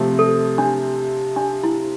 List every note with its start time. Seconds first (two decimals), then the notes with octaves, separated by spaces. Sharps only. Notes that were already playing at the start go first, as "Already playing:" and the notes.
Already playing: C3 F3 A3 C4
0.19 A4
0.58 D4
1.37 D4
1.63 E4